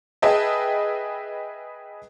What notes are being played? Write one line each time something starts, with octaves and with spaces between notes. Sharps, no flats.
G#4 B4 D#5 E5 G5 A5